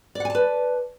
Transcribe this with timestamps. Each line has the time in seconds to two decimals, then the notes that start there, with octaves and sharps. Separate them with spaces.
0.15 D5
0.20 F#5
0.25 G#5
0.30 A5
0.35 B4